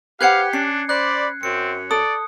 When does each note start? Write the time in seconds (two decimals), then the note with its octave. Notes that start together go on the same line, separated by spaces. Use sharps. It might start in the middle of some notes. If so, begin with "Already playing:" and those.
0.21 G4 B4 C5 F5 F#5 F#6 G#6 C#7
0.53 C#4 D4 C7
0.89 C5 D5 B5 F#6
1.43 F#2 C4 C#7
1.91 A4 D5 D#6